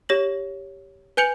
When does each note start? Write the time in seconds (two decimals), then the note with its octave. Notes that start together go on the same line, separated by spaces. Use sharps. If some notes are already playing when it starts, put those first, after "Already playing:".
0.09 G4 C#5 A#6 F#7
1.17 B4 G#5 G6 C#7 F7 F#7